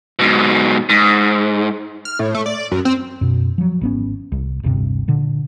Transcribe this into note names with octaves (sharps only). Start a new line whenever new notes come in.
G#2 B2
G#2
F6
A2
A3
D5
F#2
C4
F#2 B2
F3 F#3
G#1 B3 C#4
C2
D1 G1 G2 C3
A#2 D3